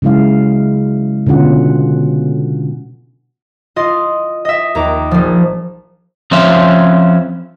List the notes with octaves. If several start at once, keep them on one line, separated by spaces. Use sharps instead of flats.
C#3 F#3 G#3 E4 F5
B2 D3 C#4 F4 F#5
F4 D#5 C6
D#5 E5
D#2 A#5 D6
A#1 F3
F3 C4 C#4 C5 E5 F5